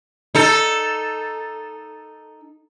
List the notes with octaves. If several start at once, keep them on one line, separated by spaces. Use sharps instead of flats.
D#4 A4